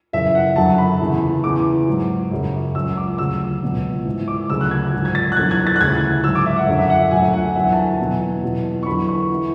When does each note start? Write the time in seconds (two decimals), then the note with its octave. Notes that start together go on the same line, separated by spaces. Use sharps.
0.13 F#2 C#3 E3 E5
0.35 F#5
0.56 F#2 D3 F#3 A5
0.78 B5
1.00 E2 C#3 E3
1.44 E2 C#3 E3 D6
1.88 G#2 F#3
2.31 F#2 C#3 F#3
2.75 C#2 C#3 F#3 E6
2.97 D6
3.18 D2 C#3 F#3 E6
3.63 C#2 B2 F#3
4.05 G#2 E3
4.28 D6
4.50 D2 C#3 F#3 E6
4.61 F#6
4.71 G#6
4.93 G#2 F#3
5.05 G#6
5.15 A6
5.32 F#6
5.37 E2 D3 F#3 G#6
5.51 G#6
5.67 A6
5.76 F#6
5.80 D2 C#3 E3 G#6
6.24 G#2 F#3 E6
6.35 D6
6.46 E5
6.56 F#5
6.68 F#2 D3 F#3
6.78 E5
6.90 F#5
7.11 D2 D3 F#3 G#5
7.34 F#5
7.55 E2 D3 F#3 E5
7.67 F#5
7.73 A5
7.77 G#5
7.88 A5
7.99 E2 B2 F#3
8.43 E2 B2 F#3
8.83 C#6
8.86 E2 D3 F#3 B5
9.08 C#6
9.34 E3